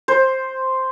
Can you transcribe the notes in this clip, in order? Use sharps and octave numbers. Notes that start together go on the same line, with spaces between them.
C5